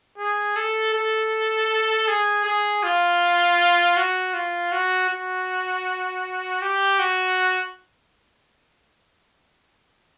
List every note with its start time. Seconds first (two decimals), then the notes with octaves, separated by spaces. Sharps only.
0.18 G#4
0.56 A4
0.94 A4
2.08 G#4
2.45 G#4
2.83 F4
3.96 F#4
4.34 F4
4.72 F#4
5.09 F#4
6.62 G4
6.99 F#4